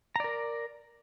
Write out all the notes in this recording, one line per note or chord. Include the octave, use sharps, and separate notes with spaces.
A#4 D5 A#5